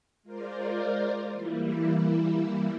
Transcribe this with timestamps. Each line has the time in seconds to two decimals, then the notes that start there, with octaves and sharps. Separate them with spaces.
0.23 G#3 F4 A#4 C5 D5
1.31 E3 G3 A#3 E4